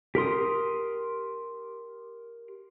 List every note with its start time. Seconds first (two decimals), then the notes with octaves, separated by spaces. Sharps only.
0.15 G4 A#4 C6 D#6